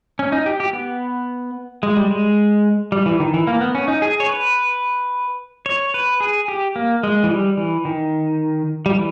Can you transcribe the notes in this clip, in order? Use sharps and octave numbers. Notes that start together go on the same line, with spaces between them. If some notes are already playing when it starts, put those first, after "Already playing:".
C#4
D#4
G4
G4
B3
G#3
G3
G#3
G3
E3
D#3
E3
A#3
B3
C#4
D#4
G#4
C#5
B4
C#5
B4
G#4
G4
A#3
G#3
E3
G3
E3
D#3
G3
E3